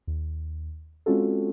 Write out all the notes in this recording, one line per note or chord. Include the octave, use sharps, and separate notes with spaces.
D#2
G#3 C4 C#4 F4 F#4 A4